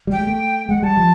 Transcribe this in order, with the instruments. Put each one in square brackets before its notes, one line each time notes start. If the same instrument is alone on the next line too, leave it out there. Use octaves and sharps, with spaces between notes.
[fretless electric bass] G3
[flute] G5
[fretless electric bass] G#3
A3
[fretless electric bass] G#3 [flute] F#5
[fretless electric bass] G3 [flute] A5
[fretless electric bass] F3